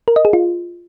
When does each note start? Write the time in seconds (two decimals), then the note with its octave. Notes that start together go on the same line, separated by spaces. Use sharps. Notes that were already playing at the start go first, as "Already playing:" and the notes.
0.08 A#4
0.16 D#5
0.25 G#4
0.33 F4